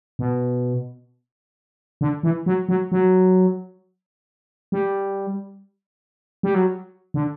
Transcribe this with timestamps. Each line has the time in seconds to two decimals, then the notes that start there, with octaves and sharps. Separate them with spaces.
0.19 B2
2.01 D3
2.23 E3
2.46 F#3
2.69 F#3
2.92 F#3
4.72 G3
6.43 G3
6.54 F#3
7.14 D3